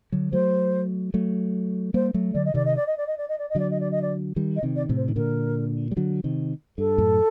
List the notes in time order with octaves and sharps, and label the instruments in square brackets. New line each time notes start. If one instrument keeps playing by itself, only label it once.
[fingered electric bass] D3 F#3
[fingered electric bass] F#3 A3 [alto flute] C5
[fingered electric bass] F#3 A3
[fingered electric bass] G3 A#3 [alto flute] C5
[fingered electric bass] F#3 A3
[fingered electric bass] D3 F#3 [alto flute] D5
[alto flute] D#5
[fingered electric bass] C3 D#3 [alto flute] D5
[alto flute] D#5
D5
D#5
D5
D#5
D5
D#5
D5
D#5
[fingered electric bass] D3 F#3 [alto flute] D5
[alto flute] D#5
D5
D#5
D5
[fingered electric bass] D#3 G3
[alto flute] D#5
[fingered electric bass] C3 D#3
[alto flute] D5
[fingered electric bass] A2 C3
[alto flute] C5
[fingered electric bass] D#3
[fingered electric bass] A#2 D3 [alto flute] A#4
[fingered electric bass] G3
D3 F#3
C3 D#3
[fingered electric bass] G2 [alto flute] A4
[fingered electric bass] F#2 A2